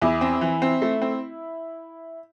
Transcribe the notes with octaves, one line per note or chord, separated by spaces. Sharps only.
E2 E4
C4
E3
C4
A3
C4